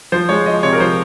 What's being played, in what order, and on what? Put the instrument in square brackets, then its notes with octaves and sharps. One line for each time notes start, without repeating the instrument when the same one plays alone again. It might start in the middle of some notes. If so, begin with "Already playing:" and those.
[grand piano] F3 C5
G#3 C#5
F3 D#5
C3 C#5
A#4
F3 C5